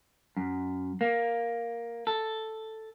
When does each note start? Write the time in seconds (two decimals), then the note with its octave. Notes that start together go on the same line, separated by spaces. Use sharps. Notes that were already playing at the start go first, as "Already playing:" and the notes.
0.37 F#2
1.01 A#3
2.07 A4